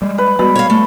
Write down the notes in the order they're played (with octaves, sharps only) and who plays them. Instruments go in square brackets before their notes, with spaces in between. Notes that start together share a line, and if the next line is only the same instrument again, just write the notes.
[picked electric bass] G3 G#3
[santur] B4
[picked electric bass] G3 G#3 [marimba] B3 F#4 B4 [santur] B5
[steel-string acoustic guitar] C#5 F5
A3